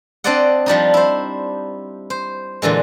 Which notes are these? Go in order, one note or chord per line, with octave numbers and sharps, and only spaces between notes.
C4 D4 C5 D5 D#5 F#5
F3 G3 D4 D#4
E4 C5
C5
A#2 D3 E3 G#3